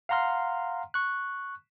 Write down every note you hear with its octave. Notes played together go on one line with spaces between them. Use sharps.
F5 F#5 A#5 C6 F6
C#6 F#6